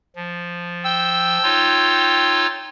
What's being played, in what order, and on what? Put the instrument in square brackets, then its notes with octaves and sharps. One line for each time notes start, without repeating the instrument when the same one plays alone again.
[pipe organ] F3
[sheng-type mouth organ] G5 E6
[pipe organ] D#4 F4 C#5